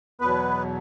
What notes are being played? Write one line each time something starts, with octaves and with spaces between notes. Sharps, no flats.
E2 B2 F#3 B3 B4